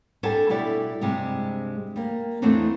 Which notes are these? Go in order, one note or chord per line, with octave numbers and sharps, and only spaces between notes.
G3 D4 A4 F#5 G#5 A5
B2 G3 E4 D5 F#5
G2 C3 G3 G#3
G3 A#3
E2 A3 B3 C4 D4 D#4